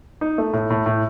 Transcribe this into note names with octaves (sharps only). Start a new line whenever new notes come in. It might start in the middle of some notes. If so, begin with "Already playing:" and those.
D#4
A3
A2
A2
A2